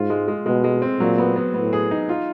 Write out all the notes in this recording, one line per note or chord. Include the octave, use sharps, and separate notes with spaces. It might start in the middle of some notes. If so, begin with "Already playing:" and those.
Already playing: G#2 F4
G#3
G#3
B2 G#3
G#3
C4
A#2 F#3
B3
B3
A2 B3
G#4
D#4
F4